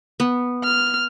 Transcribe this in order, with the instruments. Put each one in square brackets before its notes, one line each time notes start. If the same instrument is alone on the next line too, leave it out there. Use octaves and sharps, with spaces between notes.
[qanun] B3
[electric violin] F6